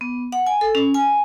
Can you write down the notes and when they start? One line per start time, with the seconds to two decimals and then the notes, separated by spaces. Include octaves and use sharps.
0.01 B3
0.32 F#5
0.47 G#5
0.61 A4
0.75 C#4
0.94 G#5